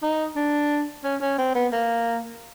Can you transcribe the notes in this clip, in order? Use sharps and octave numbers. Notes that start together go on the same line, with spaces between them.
D#4
D4
C#4
C#4
C4
B3
A#3